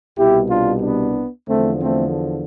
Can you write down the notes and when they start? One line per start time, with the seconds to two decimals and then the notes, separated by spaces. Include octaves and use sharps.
0.16 C2 B2 G3 E4 G4
0.50 D4 F4
0.82 B3 D4
1.48 E2 D3 F3 A3 C4
1.82 A3 C4